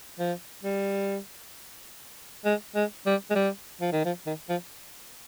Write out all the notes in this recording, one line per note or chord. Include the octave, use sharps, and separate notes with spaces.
F3
G3
G#3
G#3
G3
G#3
G3
F3
D#3
F3
D#3
F3